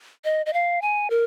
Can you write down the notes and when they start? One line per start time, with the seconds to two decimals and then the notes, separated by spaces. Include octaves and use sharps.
0.24 D#5
0.46 D#5
0.53 F5
0.82 G#5
1.10 A#4